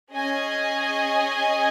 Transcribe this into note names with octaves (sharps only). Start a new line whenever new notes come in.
C#4 G#4 D#5 G#5